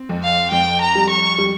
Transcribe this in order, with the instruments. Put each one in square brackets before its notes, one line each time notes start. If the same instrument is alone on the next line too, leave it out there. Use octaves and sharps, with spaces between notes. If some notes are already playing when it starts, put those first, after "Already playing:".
Already playing: [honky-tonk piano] C4
F2
[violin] F5
[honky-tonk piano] F2 [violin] G5
[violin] A#5
[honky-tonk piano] G3
[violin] C#6
[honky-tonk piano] G3